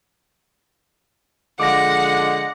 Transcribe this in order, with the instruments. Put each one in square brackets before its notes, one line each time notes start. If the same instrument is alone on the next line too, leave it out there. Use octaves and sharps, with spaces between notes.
[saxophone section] D3 F3 G#3 [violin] F#5 [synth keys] D6 A#6